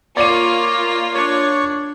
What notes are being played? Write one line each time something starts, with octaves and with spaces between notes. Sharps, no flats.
A#3 F4 C#5 D5 D#7
D4 C#5 C#6